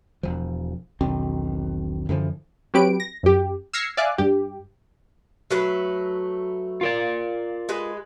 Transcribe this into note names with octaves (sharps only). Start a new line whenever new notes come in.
E1 F3
E1 B1 D#3 C4
F#2 D3 E3 F3
F#3 C4 G4 B4 D7
A#6
F#2 G4
E6 F6 G#6 A#6 C7 C#7
D5 E5 F5 G#5 F#6
G2 G4
F#3 A3 B4
F4 A#4 D5
G#3 B4